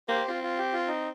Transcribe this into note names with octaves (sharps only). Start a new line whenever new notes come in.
A#3 G4 C5
C4 F4
F4
G4
F4
D#4